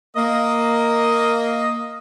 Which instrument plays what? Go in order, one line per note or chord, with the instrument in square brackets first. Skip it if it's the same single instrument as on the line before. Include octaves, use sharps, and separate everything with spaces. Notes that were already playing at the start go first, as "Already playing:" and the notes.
[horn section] A#3 D#5